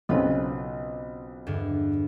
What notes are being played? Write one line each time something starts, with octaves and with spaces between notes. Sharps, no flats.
B1 C#3 C4 F4 B4
E2 G2 D3